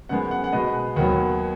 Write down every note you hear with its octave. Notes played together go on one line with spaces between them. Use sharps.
F#2 D#3 G#3 B3 F#5
F#5
F#5
B2 G#3 B3 D#5
D#2 D#3 F#3 B3 F#5